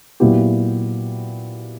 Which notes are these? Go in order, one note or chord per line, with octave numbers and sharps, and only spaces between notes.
A#2 F#3 B3 E4 G4